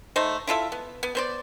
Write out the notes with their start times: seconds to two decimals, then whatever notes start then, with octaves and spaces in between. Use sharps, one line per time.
0.16 A3 D#4 C5
0.47 E4 F4 A4 E5
0.72 B3
1.03 B3
1.15 B3 C5 D5